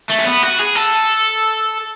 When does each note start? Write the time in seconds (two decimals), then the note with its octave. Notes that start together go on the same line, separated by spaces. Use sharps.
0.10 A3
0.19 C#4
0.26 B3
0.43 F#4
0.59 G#4
0.75 A4